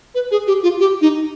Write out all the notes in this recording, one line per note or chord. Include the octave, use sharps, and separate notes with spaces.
B4
G#4
G4
F4
G4
D#4